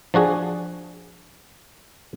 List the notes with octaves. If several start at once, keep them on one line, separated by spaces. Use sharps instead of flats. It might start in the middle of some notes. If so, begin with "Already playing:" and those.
F3 D4 F#4 G#4